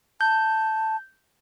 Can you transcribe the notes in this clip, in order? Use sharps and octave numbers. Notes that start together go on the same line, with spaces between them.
A5 G6